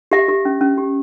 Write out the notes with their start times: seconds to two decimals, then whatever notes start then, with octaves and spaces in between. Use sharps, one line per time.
0.12 G4 E5
0.28 G4
0.45 C#4
0.61 C#4
0.78 G4